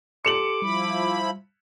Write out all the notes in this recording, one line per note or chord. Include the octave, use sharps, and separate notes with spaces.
G4 A4 C6 D6 C#7 E7 F#7
F3 G3 E4 B5